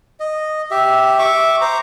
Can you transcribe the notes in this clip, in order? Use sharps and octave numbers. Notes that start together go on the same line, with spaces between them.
D#5
G4 E5
E5 C#6 D6
C5 A#5 D6